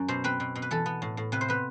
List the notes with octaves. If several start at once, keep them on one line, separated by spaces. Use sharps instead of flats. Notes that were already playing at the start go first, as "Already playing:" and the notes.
Already playing: F#2
B2 C5
C4 B4
B2
B2
B4
E3 A4
B3
A2
A2
C3 B4
C5
B3 B4